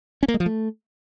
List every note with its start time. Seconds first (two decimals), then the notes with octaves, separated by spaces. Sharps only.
0.23 C#4
0.28 A#3
0.34 G#3
0.40 F3
0.46 A3